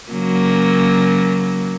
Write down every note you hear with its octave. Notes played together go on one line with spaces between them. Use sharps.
C#3 F#3 A#3